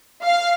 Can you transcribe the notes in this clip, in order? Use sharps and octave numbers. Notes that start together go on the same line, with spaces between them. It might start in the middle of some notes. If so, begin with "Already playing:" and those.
F5